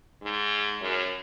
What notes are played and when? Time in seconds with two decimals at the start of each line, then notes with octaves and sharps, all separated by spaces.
0.22 G#2
0.81 F#2